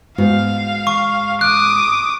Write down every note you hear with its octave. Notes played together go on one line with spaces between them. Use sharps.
G#2 B3 F#4 F5
C#6
D6 D#6 F#6